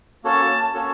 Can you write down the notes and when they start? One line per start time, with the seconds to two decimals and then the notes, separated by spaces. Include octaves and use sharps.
0.24 A#3 C#4 F#4 A4 C#5 A5
0.74 A#3 C#4 F#4 A4 C#5